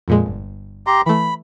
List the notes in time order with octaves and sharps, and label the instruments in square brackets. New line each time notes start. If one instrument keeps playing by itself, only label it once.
[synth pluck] F2 A#2 G#3
G1
[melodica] G4 A#5 C6
[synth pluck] E3 A3 [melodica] B5